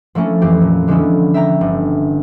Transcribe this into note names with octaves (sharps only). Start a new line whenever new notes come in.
F3 A3 A#3 C#4 E4
F2 E3 G4
A#2
D3 F3 G#3 B3 C#4 E4
E5 G5 A#5
G1